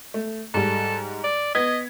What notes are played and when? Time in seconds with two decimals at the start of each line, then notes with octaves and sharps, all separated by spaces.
0.14 A3
0.54 G#2 G3 A4
1.24 D5
1.55 B3 D#5 G#6 B6